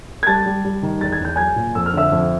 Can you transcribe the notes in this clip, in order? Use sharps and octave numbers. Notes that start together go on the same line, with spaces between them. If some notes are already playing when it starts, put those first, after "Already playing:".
G#6
G3 A5 A6
G3
G3
D#3
E2 A6
G#6
E2 G6
F#3 G#5 G#6
A#2
F2 E6
F6
D3 E5 E6
F2